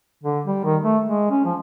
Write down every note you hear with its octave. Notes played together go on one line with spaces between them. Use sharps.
D3
G3
D#3
A3
G#3
C#4
F3